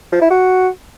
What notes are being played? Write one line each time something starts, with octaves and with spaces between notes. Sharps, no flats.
F3
E4
F#4